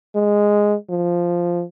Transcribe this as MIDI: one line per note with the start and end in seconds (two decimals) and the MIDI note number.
0.15 0.75 56
0.90 1.63 53